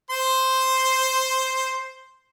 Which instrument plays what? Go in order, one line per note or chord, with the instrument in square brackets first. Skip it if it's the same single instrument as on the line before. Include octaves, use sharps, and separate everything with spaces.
[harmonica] C5 C6